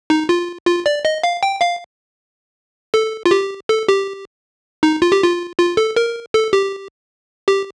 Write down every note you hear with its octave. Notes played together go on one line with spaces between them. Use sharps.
D#4
F4
F4
D5
D#5
F5
G5
F5
A4
F4
G4
A4
G4
D#4
F4
G4
F4
F4
A4
A#4
A4
G4
G4